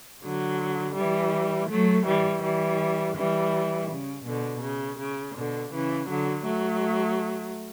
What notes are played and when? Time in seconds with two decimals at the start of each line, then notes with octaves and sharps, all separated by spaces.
0.22 D3 F#3
0.95 E3 G3
1.68 F#3 A3
2.06 E3 G3
2.42 E3 G3
3.16 E3 G3
3.90 C#3
4.25 B2 D3
4.63 C#3
4.99 C#3
5.35 B2 D3
5.72 C#3 E3
6.09 D3 F#3
6.45 F#3 A3